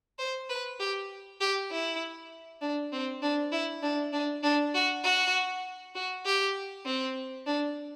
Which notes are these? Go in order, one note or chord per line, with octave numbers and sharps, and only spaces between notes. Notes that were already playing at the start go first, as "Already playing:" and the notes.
C5
B4
G4
G4
E4
D4
C4
D4
E4
D4
D4
D4
F#4
F#4
F#4
G4
C4
D4